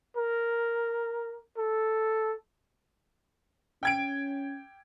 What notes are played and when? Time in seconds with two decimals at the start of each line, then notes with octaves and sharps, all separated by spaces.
0.17 A#4
1.58 A4
3.83 C#4 G5 G#6 D7